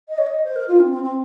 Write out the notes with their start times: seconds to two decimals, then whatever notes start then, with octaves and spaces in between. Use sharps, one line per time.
0.09 D#5
0.18 C#5
0.26 D#5
0.44 C5
0.56 A#4
0.68 F4
0.80 C4
0.91 C4
1.03 C4